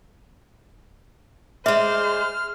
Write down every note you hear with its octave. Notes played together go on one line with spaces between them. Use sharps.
G#3 C5 D5 E5 F6